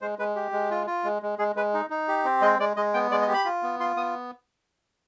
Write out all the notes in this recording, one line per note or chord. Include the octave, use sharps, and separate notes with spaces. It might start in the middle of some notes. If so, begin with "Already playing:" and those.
G#3 C5
G#3 B4
G4
G#3
F4
F4
G#3
G#3
G#3 G#4
G#3 B4
D#4
D#4
G4
C4
G#3 D#5
G#3 D5
G#3 D#5
B3 G5
G#3 D5
D#5
G4
B5
F4
B3
F4 C6
B3 D#6